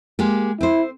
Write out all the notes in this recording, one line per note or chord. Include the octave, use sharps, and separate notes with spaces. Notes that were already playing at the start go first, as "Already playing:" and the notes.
G#3 A#3 G4
C4 E4 C5